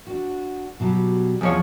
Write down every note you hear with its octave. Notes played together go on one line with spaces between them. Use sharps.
D4 F#4
B2 F#3 G3
E2 F3 C#5